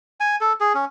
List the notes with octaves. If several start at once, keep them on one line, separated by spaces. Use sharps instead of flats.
G#5
A4
G#4
C#4